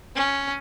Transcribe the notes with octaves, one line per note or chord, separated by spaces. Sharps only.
C#4